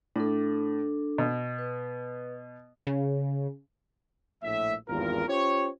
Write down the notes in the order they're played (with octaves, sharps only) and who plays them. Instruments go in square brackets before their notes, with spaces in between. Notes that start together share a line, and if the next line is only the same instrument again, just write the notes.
[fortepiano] A2 [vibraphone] D4 A4
[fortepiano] B2
[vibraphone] B4
[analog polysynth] C#3
[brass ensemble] A#1 A2 E5
G#1 E2 G2 F4 A#4
C#4 F4 G4 C5 C#5